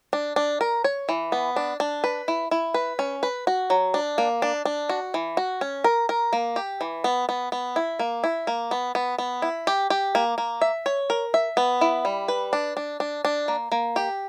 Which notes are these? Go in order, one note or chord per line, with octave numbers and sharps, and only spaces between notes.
D4
D4
A#4
C#5
E3
B3
D4
D4
B4
E4
E4
B4
C#4
B4
F#4
F#3
D4
A#3
D4
D4
F#4
E3
F#4
C#4
A#4
A#4
A#3
G4
E3
B3
B3
B3
E4
A#3
E4
A#3
B3
B3
B3
E4
G4
G4
A#3
A#3
E5
C#5
A#4
E5
B3
E4
G3
B4
D4
D4
D4
D4
A#3
A#3
G4